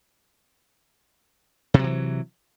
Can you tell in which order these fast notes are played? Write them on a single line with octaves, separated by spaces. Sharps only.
C3 F#3 E3